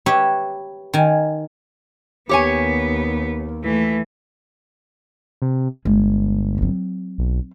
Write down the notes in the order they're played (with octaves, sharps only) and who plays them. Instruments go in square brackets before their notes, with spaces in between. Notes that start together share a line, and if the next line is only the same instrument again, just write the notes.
[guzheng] G4 B4 C#5 E5
D#3 G#5
[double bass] D#2 [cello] B3 [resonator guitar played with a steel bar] G4 C#5 G#5
[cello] E3 A3
[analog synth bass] C3
[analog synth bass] G1 [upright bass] G#3
[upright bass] F#3 C4
[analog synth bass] B1